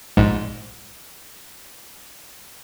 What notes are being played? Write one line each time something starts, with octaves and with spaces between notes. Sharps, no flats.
A#1 G#2